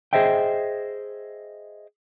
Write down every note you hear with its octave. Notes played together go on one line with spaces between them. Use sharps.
G#4 C5 D#5 E5 G5